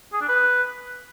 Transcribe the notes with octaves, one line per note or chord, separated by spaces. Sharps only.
G#4
D4
B4